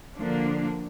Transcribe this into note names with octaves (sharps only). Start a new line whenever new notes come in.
D3 F3 A#3 D4